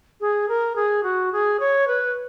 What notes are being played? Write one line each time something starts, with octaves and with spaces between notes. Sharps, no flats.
G#4
A#4
G#4
F#4
G#4
C#5
B4